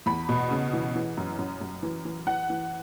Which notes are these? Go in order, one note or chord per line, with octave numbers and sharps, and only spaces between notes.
E2 B5
B2
C#3
E3
E3
F#2
F#2
F#2
E3
E3
E3 F#5
E3